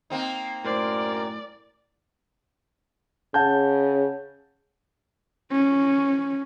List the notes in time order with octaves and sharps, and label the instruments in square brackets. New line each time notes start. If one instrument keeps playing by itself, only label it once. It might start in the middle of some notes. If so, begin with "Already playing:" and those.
[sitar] A#3 C4 D#4
[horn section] F#2 A#4 [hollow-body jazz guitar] A2 C5 [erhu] D5
[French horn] C#3 [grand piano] F#5 A5 G6
[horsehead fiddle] C#4